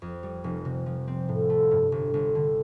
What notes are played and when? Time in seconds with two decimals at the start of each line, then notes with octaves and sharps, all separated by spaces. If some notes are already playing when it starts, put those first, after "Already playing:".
0.02 F2
0.23 G3
0.44 F1
0.65 C3
0.86 F3
1.08 C4
1.29 A2
1.50 A3
1.71 G2
1.92 G1
2.14 G1
2.35 D3